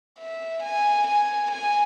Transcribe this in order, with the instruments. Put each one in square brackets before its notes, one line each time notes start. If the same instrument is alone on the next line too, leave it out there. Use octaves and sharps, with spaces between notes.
[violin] E5
G#5
G#5
G#5